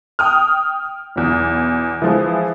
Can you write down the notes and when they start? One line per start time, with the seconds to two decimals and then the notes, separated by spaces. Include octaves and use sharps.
0.19 G5 D#6 F6
1.16 B1 E2
2.02 E3 F3 G#3